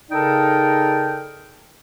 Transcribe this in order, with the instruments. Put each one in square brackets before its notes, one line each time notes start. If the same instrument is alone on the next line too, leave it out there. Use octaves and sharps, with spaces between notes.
[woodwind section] C#3 D#4 A4 A#4 D5 G5